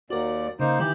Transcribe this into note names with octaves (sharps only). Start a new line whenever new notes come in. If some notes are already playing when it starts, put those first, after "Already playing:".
D#2 F#4 A#4 D5
C#3 A#3 D#4 C5
D#3 E3 G4 G6